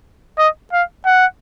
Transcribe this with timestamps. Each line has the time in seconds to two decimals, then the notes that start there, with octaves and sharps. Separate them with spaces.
0.38 D#5
0.73 F5
1.06 F#5